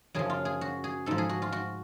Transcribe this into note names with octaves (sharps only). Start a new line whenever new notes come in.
F#2 C#3 F3 G#4
F4
G#4
F#4
G#4
G#2 F3 A4
G#4
F#4
F4
F#4